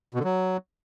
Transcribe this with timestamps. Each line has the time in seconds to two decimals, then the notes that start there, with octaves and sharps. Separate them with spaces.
0.14 B2
0.19 D3
0.25 F#3